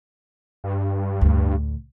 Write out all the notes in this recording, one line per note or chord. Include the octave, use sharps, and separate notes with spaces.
G2
A1 D2